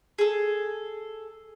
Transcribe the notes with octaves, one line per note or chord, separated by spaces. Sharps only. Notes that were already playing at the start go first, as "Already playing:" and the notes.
G#4 A4